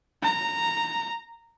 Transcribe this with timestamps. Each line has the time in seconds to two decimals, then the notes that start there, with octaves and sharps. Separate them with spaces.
0.23 A#5